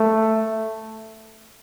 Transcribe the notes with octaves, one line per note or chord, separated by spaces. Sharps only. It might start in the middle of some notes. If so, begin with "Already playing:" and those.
Already playing: A3